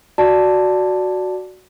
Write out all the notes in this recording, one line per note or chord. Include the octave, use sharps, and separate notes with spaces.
F#4 D5 A5